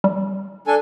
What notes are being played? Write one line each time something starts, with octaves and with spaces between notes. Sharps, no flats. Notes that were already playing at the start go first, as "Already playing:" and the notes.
G3
D4 A4 G#5